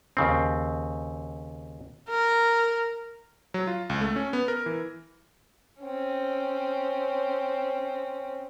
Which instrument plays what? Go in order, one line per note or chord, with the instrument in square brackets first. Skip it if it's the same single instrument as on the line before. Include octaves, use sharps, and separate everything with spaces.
[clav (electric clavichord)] D#2 C#3 C4
[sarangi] A#4
[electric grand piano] F#3
F4
C#2
A3
C#4
B3
A#4
E3
[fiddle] C4 C#4